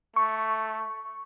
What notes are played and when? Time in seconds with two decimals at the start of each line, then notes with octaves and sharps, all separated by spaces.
0.16 A3 C#6